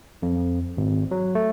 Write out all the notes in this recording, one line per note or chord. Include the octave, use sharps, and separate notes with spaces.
F2
G#1
F#3
A3